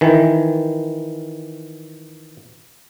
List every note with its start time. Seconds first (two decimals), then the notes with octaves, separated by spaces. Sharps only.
0.01 D#3 E3